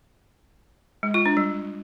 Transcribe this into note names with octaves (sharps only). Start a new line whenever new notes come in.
G#3
F4
D4
G3